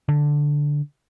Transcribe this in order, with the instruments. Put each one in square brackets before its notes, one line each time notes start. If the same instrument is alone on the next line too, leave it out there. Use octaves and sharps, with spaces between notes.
[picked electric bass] D3